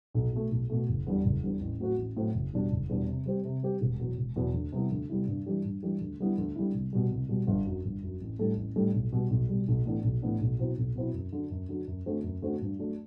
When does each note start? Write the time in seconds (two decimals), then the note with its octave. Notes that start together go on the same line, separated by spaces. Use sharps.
0.14 B1
0.33 B2 A3
0.51 B1
0.70 B2 A3
0.89 F#1
1.07 E2 D3 G3
1.25 F#1
1.43 E2 D3 G3
1.61 A1
1.80 A2 F#3 C4 F#4
1.98 A1
2.17 A2 F#3 C4 F#4
2.35 F#1
2.53 E2 B2 G3 D4
2.71 F#1
2.89 E2 B2 G3 D4
3.08 C3
3.26 G3 C4 G4
3.45 C3
3.63 G3 C4 G4
3.81 E1
3.99 E2 B2 F#3
4.18 E1
4.36 E2 B2 F#3
4.54 D2
4.72 C3 G3 B3 E4
4.91 D2
5.10 C3 G3 B3 E4
5.27 G2
5.46 E3 G3 D4 G4
5.65 G2
5.83 E3 G3 D4 G4
6.01 D2
6.20 D3 G3 B3 E4
6.38 D2
6.56 D3 G3 B3 E4
6.74 C2
6.93 B2 G3
7.11 C2
7.29 B2 G3
7.47 G1
7.66 F#2 F#3
7.85 G1
8.03 F#2 F#3
8.21 A1
8.39 A2 G3 D4 A4
8.57 A1
8.76 A2 G3 D4 A4
8.94 B1
9.13 B2 G3
9.31 B1
9.49 B2 G3
9.68 B1
9.85 A2 E3 B3 D4
10.04 B1
10.22 A2 E3 B3 D4
10.41 B1
10.59 B2 F#3 C4 E4
10.77 B1
10.96 B2 F#3 C4 E4
11.14 F#2
11.33 D3 F#3
11.51 F#2
11.69 D3 F#3
11.87 F#2
12.06 D3 A3 C4 F#4
12.24 F#2
12.42 D3 A3 C4 F#4
12.61 G2
12.79 F#3 A3 D4